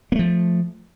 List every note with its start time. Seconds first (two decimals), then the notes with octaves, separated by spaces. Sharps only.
0.12 A#3
0.16 A3
0.19 F3